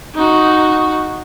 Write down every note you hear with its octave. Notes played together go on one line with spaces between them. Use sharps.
D#4 F#4